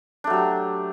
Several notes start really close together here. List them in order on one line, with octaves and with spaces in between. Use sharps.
D4 A3 F#3 G4